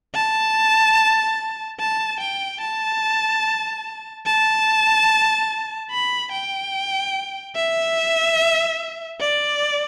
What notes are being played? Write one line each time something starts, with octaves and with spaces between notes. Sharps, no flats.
A5
A5
G5
A5
A5
B5
G5
E5
D5